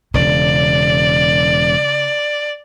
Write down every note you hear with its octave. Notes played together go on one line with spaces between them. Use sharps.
E1 C#3 D5